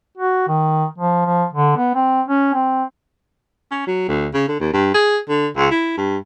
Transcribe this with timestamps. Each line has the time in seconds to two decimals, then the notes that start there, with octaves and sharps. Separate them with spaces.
0.17 F#4
0.48 D#3
0.98 F3
1.25 F3
1.53 D3
1.77 B3
1.95 C4
2.28 C#4
2.54 C4
3.71 C#4
3.87 F#3
4.09 D2
4.34 C#3
4.48 D3
4.60 D#2
4.73 G2
4.94 G#4
5.29 D3
5.57 C#2
5.71 E4
5.97 G2